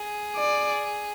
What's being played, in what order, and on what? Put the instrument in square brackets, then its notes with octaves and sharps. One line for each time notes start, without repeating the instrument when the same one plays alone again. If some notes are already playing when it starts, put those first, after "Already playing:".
Already playing: [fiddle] G#4
[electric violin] D5